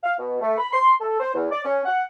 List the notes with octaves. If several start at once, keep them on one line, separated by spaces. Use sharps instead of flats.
F5
B2
A3
B5
C6
A4
C5
E2
D5
C#4
F#5